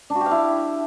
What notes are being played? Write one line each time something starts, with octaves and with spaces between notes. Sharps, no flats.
D4
F#4
G4
F5
E4